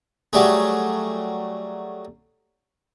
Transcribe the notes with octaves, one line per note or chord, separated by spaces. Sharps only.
F#3 G3 A3 G#4